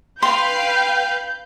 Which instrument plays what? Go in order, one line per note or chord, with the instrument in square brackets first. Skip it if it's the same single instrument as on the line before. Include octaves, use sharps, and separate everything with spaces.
[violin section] B4 F5 [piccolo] G5 [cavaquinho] C6 [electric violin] G6